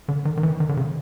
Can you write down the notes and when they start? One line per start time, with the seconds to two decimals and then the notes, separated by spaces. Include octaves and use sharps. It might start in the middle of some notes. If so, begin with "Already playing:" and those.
0.08 D3
0.25 D#3
0.37 D#3
0.43 E3
0.60 D#3
0.69 D3
0.77 C#3